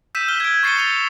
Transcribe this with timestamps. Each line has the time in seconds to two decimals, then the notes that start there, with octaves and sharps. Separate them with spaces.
0.15 E6 G6 B6 D#7 E7
0.28 F6 G7
0.40 G#6 D7
0.63 C#6 A6 C7 C#7 D#7 G7
0.76 C#7 E7 F7 G7